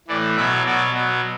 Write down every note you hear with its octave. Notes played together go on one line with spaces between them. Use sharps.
A2 E3 D5
B2 F#3 E5
B2 F#3 D5
B2 F#3